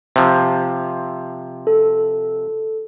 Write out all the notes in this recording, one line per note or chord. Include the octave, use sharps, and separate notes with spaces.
C3 F3
A4